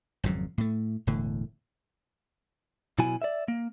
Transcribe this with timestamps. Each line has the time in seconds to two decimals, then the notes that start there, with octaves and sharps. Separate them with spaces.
0.24 G#1 F2 C#3 F#3
0.58 A2 A3
1.07 E1 A2 D3
2.99 B2 F#3 E4 F#4 G#5
3.22 D5 E5
3.48 A#3